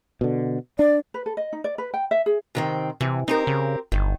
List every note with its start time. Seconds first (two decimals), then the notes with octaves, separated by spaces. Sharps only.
0.21 B2 D3
0.79 D4 D5
1.14 B4
1.26 A4
1.37 D#5
1.53 D#4
1.64 D5
1.78 B4
1.94 G5
2.11 E5
2.26 G#4
2.55 C3 D#3 C4
3.01 C3 E3
3.28 C4 D#4 G4 A#4
3.47 C#3
3.92 G1 D#3